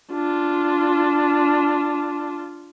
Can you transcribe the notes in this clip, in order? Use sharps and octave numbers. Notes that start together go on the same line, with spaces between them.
D4 F4